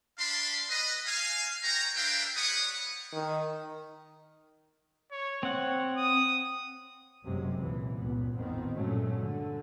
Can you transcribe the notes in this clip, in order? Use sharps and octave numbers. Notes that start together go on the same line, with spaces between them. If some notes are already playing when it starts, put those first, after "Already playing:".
D4 F5 A5 B5 C6
B4 D#5
F5 G#5
F#4 C#5 G5 A#5
D4 A#4 B4 E5 F5 G5
G3 C#5 F#5 B5 C#6 D#6
D#3
C#5
C4 C#5 F#5
D#6
F#1 F#2 C3 F#3 G#3
C#2 F#2 A#2 E3
C#2 G2 A#2 B3
A1 F2 D#3 B3 C4
G2 A#2 F#3 G#3 A3 C#4
D3